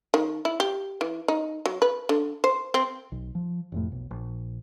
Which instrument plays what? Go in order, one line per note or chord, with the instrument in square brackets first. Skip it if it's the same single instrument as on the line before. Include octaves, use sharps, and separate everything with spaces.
[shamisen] D#3
E4
G4
E3
D#4
F#3
B4
D3
C5
C4
[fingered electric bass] B1
F3
F1 F2 A2
B1
A#1